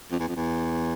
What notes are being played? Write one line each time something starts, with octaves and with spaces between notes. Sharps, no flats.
F2
E2
F2
E2